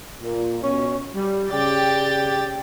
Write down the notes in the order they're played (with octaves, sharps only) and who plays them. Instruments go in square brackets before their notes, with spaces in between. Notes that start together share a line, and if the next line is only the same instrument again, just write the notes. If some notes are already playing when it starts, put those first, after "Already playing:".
[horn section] A#2
B2 C#4
G3
[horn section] C#3 D5 [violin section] G4 G5 A6